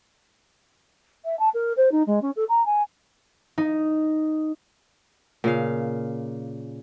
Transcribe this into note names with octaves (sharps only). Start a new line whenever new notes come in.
E5
A5
A#4
C5
D#4
G#3
C#4
A4
A#5
G#5
D#4
A#2 C#3 F5